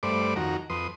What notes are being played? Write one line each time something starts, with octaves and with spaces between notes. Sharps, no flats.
G2 A3 C5 D5 B5 D6
F2 D#3 F#4 A#5
F2 B4 C6 D#6